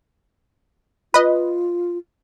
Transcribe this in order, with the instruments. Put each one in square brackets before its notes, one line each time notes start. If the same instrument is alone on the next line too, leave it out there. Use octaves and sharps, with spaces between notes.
[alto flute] F4 [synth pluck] B4 D#5